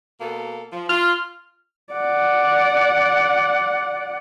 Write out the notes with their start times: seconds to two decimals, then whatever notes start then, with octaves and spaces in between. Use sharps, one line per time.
0.20 B2 A#3 A4
0.73 F3
0.89 F4 F6
1.93 D5 F#5